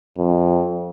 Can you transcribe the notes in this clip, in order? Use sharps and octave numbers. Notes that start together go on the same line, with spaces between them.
F2